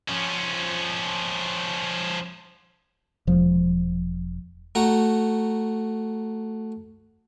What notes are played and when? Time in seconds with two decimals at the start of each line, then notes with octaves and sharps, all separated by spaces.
0.09 F3 C#4
3.27 E1 F3
4.75 A3 F#4 A#5